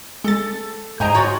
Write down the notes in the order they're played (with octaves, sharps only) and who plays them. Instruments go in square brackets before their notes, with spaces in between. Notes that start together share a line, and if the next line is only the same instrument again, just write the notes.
[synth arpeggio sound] G#3 A6 [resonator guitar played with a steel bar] A4
[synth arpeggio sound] G#2 D#5 G5 [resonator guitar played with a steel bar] C5 G#5 A#5
[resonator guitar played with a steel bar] F4 F#4 C#5